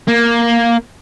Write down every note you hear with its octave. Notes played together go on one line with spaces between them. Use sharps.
A#3